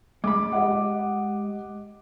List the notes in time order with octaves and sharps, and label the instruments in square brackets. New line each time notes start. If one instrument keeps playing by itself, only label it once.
[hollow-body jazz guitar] G#3 B5 [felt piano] D6
[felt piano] G4 D#5 F#5